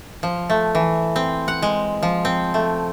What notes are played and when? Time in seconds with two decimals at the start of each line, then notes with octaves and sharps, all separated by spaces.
0.23 F3
0.50 A3
0.75 E3
1.16 C4
1.48 F#5
1.62 G#3
2.03 F3
2.25 C4
2.54 A3